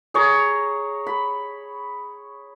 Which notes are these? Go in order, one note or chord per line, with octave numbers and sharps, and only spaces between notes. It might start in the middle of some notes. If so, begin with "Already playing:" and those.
G#4 C#5 A#5
B5